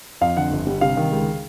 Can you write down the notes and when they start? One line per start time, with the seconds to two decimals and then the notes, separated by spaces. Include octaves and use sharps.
0.21 F2 F5
0.37 D3 F#5
0.51 G1
0.67 G3
0.81 C3 F5
0.97 D#3
1.12 C#2